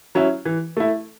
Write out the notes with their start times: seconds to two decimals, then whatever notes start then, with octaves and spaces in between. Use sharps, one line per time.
0.15 F#3 C#4 E4
0.45 E3
0.77 A3 E4